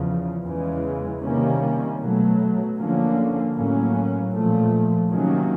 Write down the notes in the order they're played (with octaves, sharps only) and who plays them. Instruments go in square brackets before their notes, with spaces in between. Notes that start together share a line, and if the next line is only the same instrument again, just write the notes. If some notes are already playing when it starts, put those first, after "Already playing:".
Already playing: [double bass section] E2 C#3 F3
E2 C#3 E3 G#3
C3 D#3 G3 A#3 C#4
B2 F#3 A3
D3 F3 A#3 C#4
A2 F#3 A#3 C#4
A#2 F3 A3
C3 D#3 F#3 A#3 C#4